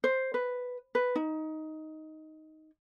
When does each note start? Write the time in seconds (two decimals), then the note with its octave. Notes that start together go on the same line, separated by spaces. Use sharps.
0.04 C5
0.34 B4
0.95 B4
1.16 D#4